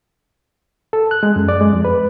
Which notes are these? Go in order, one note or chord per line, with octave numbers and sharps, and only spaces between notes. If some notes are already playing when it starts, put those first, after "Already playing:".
A4
F#6
G#3
F#2
D5
G#3
F2
B4